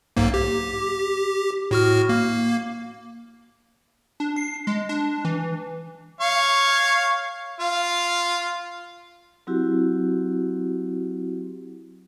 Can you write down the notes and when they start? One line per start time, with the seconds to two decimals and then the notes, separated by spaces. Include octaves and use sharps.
0.17 B1 G#2 A#3
0.34 G4
1.71 A2 F#4 F6
2.09 A#3
4.20 D4
4.36 C7
4.67 G#3
4.89 D4
5.25 E3
6.21 C#5 F5 C#6
7.60 F4 F5
9.47 F#3 C4 E4 F#4 G4